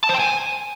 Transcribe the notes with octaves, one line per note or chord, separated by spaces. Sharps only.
A5
C5
G5
G#5